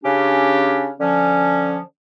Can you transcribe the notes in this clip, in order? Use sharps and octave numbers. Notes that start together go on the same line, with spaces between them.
C#3 C#4 D4 G4
D3 F3 C#4